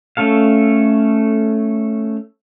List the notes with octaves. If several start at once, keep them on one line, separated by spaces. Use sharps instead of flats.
A3 C#4 A4 F5